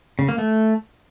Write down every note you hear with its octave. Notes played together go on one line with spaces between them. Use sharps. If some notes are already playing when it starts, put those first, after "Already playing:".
C#3
A#3
A3